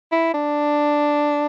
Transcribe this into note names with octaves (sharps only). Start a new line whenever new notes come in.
E4
D4